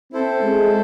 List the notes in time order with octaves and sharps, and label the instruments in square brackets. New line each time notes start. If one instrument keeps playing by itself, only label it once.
[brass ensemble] C4 [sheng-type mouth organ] E4 A4 C5
[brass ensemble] G#3